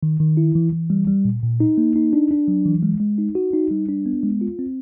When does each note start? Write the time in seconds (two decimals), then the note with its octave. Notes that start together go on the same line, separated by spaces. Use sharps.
0.03 D#3
0.20 D#3
0.37 E4
0.55 E3
0.73 E3
0.90 G3
1.07 G3
1.25 A#2
1.43 A#2
1.60 D#4
1.78 A#3
1.96 D#4
2.13 D4
2.31 D4
2.48 F#3
2.66 E3
2.83 G#3
3.00 G#3
3.18 D#4
3.35 F#4
3.53 D#4
3.71 G3
3.89 D4
4.06 B3
4.23 G#3
4.41 F4
4.59 C4